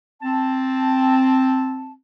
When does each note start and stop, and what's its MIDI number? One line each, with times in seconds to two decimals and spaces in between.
0.22 1.93 60
0.22 1.93 81